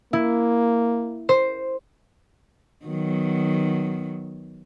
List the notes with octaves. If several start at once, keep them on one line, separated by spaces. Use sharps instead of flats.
A#3 E4
C5
D#3 F#3 B3